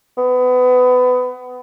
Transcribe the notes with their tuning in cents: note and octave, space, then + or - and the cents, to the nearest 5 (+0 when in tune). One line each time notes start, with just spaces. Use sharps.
B3 +25